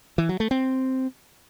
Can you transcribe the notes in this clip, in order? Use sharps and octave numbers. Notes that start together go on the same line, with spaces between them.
E3
F#3
A3
C4